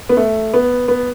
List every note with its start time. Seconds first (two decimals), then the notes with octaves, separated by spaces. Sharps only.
0.09 B3
0.17 A3
0.54 B3
0.88 B3